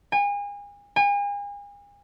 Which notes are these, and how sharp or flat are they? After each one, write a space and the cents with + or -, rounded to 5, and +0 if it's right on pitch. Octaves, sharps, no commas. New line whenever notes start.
G#5 -35
G#5 -40